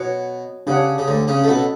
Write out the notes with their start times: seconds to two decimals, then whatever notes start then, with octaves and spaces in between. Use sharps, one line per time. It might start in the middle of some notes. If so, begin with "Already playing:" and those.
Already playing: B2 F#4 C#5 F#5
0.67 C#3 D4 G4 C#5 F#5
0.98 C#3
1.08 D2 D3
1.28 C#3 C#4
1.44 A3
1.48 B2 B3 C#4 F#4 A4